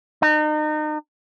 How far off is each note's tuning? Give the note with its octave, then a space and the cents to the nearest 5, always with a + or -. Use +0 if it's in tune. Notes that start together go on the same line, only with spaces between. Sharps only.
D#4 -35